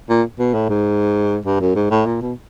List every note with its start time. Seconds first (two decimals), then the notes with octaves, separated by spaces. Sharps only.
0.09 A#2
0.39 B2
0.54 A2
0.69 G#2
1.46 G2
1.61 F#2
1.75 G#2
1.91 A2
2.06 A#2
2.21 B2